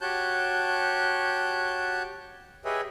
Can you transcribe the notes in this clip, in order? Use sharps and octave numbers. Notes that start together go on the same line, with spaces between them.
F#4 G4 C#5 A5 F#6 G6
G4 G#4 B4 C#5 D#5 E5